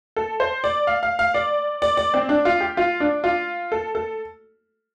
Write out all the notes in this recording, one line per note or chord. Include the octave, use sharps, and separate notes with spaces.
A4
C5
D5
F5
F5
F5
D5
D5
D5
C4
D4
F4
G4
F4
D4
F4
A4
A4